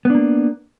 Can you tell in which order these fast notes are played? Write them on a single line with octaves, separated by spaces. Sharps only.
B3 D4 A#3